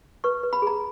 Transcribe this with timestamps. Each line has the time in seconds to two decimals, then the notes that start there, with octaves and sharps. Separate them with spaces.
0.24 B4 C#6
0.43 B4
0.53 B5
0.62 G#4 A#5